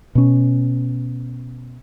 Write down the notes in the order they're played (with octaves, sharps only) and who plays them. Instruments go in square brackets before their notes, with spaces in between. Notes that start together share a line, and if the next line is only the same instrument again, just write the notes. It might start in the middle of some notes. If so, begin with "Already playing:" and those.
[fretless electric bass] B2 C#4